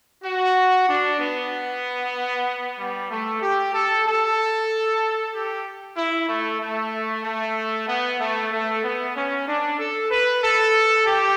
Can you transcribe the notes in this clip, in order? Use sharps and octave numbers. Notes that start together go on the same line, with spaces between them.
F#4
D4
B3
G3
A3
G4
A4
A4
G4
E4
A3
A3
A3
B3
A3
A3
B3
C#4
D4
A4
B4
A4
G4